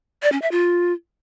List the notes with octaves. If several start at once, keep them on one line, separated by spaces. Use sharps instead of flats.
D5
C#4
E5
F4